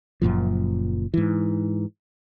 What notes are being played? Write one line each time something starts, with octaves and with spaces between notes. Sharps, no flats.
F#1 F#2 A#2 F3
G#2 E3